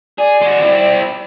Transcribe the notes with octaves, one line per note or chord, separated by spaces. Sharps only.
G#4 D5
G#3 F#4
C4 E4